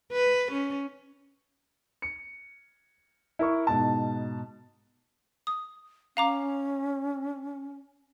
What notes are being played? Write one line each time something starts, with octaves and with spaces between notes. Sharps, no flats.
B4
C#4
C#7
E4 A#4 C#6
G#2 B2 A5
D#6
C#4 F5 A#5 D6